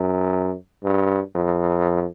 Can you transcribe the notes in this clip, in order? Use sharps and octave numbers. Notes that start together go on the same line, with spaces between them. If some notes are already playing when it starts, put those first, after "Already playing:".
Already playing: F#2
G2
F2